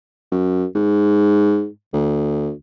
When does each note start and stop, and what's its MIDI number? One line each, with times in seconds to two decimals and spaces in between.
0.32 0.65 42
0.75 1.67 44
1.93 2.52 38